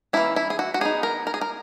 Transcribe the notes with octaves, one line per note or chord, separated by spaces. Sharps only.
E3 A#3 C#4 E4
E4
G#4
F#4
F#4
F#3 B3 D#4 G#4
A#4
A#4
G#4
A#4